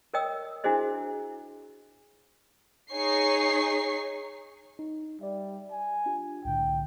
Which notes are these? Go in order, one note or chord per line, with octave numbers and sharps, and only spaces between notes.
A#4 C#5 D#5 G5 D#6 E6
D4 E4 F#4 G#4 C5 D#5
D#4 G#4 C#5 C#6 C7
D#4
G3 D5 E5
G#5
D4 F4 G4
C2 A2 D3 G5